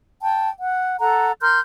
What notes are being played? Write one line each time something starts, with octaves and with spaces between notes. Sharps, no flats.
G5 A5
F#5
A4 F#5 A#5
A#4 C6 F6 G6